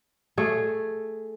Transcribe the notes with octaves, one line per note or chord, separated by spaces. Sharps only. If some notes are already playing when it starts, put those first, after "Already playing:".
A3 G#4